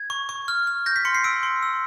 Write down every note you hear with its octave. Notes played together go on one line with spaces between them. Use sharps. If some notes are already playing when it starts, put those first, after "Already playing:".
Already playing: G#6
C#6
C#6
F6
F6
G6 A#6
B6
C6 C#7
C7
E6 D7
C6
E6